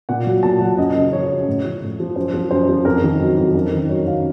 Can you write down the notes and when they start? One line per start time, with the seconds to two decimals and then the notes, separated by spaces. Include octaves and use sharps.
0.09 A#2 F#5
0.26 F#3
0.43 A#2 A5
0.61 F#3 F#5
0.78 F#2 D#5
0.95 C#3
1.12 F3 C#5
1.30 F#2
1.47 A2
1.64 F3
1.82 A2
2.00 F3
2.16 F#2 C5
2.33 F3
2.51 F#2 C5
2.69 F3
2.85 F2 A#4
3.02 D#3
3.20 F#3
3.37 F2
3.54 F#2 A#4
3.73 D#3
3.89 F#3 C#5
4.07 F#2 F5